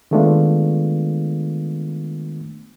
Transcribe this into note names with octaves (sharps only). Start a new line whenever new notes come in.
D#3 G#3 A3 B3 D4 F4